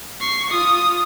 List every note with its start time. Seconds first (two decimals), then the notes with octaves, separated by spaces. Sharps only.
0.21 C#6 C7
0.50 F4 D#6